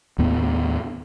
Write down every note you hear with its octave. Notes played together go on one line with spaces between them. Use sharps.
D#2 A2 B3